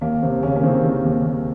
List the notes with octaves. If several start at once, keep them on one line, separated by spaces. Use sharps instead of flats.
D#2 A#3
D#2 C3 C4
D#2 C#3 C#4
A#3
C3 D#3 C4
D#3
D#2
D#2